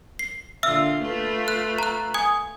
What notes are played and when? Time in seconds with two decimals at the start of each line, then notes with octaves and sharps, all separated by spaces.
0.19 C7
0.63 A#2 D3 F4 E5 E6 F6
1.02 A3 F4 B4
1.48 F#6
1.78 A#5 F#6
2.14 G#5 D#6 G#6